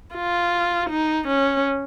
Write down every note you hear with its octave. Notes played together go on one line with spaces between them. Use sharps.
F4
D#4
C#4